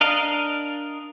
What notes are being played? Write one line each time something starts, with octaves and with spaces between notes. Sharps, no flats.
D4 A#4 D#5 F5